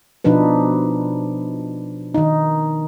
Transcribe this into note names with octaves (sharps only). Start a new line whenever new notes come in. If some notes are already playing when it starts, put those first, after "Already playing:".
B2 F3 D4 D#4 B4
D#3 D#4